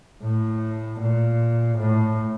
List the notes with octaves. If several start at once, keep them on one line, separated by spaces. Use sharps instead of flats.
A2
A#2
A2